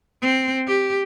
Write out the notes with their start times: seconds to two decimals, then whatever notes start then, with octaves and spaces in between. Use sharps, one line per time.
0.22 C4
0.67 G4